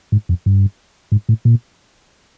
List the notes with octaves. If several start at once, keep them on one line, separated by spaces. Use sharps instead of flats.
G#2
F2
G2
G#2
A2
A#2